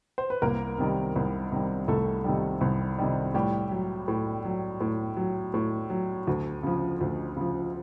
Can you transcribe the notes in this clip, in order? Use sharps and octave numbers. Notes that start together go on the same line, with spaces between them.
C5
B4
C2 A#3 A#4
C3 D#3 G3
C2
C3 D#3 G3
C2 A3 A4
C3 D#3 G3
C2
C3 D#3 G3
A2 G3 G4
F#3
A2
F#3
A2
F#3
A2
F#3
D2
C#3 F3
D2
C#3 F3